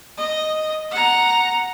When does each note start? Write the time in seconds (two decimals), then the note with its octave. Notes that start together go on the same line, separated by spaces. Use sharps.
0.18 D#5
0.91 F#5 A#5